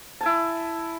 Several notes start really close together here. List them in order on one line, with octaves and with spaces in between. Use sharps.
A5 G#5 E4